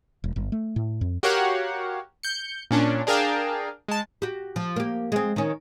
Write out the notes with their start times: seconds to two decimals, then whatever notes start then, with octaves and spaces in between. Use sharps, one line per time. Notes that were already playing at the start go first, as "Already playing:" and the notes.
0.24 E1
0.36 G1
0.52 A3
0.76 A2
1.01 F2
1.23 F#4 G4 A#4 C#5 F5 F#5
2.23 G6 C#7
2.71 A#2 C#4 D4
3.07 D4 G#4 A#4 F5 G5 A5
3.88 G#3 A5
4.22 F#4 G4
4.56 F3
4.76 A#3 G4
5.12 G#3 C4
5.36 D#3 C#4